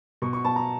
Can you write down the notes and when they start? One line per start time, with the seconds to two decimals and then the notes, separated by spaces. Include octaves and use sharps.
0.22 B2 C#6
0.33 C#6
0.45 B2 A5
0.56 A#5